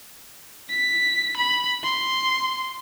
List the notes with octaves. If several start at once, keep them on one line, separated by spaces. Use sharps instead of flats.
B6
B5
C6